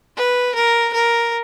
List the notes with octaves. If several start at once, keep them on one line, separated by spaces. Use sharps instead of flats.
B4
A#4
A#4